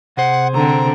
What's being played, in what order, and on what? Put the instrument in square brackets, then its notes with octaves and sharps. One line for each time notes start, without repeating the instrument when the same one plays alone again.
[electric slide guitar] C3 G#4 C5 [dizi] F#5
[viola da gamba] D3 C4 [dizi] A#5